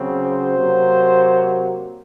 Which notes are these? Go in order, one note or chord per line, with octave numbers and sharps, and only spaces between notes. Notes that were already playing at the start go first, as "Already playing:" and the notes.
Already playing: C#3 F#3 C4
C5
C3 F#3 A#3